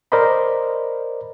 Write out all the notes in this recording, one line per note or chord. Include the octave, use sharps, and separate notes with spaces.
A#4 C5 D5 D#5 B5